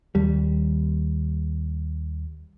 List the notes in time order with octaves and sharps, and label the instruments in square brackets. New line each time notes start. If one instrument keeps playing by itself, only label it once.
[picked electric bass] D#2 G3